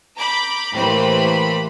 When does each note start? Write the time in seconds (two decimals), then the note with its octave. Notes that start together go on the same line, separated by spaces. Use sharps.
0.15 A#5 B5 D6 G6
0.75 A2 E3 A#3 G4 C5 B5